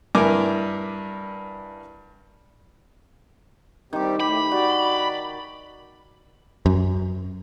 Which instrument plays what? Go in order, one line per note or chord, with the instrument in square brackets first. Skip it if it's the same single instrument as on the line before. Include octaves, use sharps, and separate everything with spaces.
[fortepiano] G2 E4 A#4 G#5 D6
[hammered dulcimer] D#3 D6 [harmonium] G3 C4 G4
[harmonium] A2 [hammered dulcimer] G4 [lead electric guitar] B5
[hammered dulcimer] F#4 [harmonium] D5
[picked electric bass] F#2